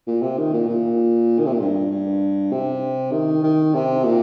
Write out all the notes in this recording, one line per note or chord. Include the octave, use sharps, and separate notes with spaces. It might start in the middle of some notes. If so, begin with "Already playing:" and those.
A#2
C3
D#3
A#2
A#2
D#3
C3
A#2
G2
G2
C3
D#3
D#3
C3
A#2